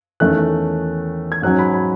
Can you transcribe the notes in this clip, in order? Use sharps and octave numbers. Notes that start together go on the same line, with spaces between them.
E2 D#3 A3 C#4 F#6
G#6
G#2 F#3 C#4 F#6
B5
B5